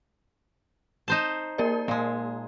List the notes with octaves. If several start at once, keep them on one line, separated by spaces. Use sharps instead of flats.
D#4 C5 A5
A#3 A#4 D5
A#2 G#3 A#3